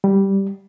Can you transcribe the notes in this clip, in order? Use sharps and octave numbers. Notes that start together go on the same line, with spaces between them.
G3